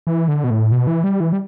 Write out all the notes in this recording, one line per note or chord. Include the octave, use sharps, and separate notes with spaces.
E3
D3
B2
A2
B2
E3
G3
E3
G3